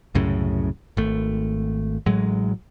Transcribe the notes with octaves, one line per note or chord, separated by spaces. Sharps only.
C2 F#2 A2 C#3
G#1 A3
A1 A2 F#3 G#3